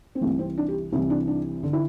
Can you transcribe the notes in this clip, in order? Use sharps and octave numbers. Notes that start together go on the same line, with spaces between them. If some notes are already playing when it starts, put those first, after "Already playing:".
C4
C2 C3 E3 A3
C4
D4
G4
C2 C3 E3 E4
D4
D4
D3
E4